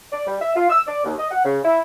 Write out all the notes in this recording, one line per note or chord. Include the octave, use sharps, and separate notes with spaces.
D5
G3
E5
F4
E6
D5
D#2
D#5
F#5
C#3
E4